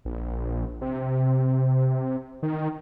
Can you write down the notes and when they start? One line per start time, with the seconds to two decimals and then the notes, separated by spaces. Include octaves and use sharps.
0.05 A#1
0.81 C3
2.43 D#3